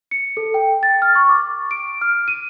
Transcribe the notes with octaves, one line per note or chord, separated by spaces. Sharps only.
C#7
A4
G5
A6
F6
C#6
D6
D7
F6
D#7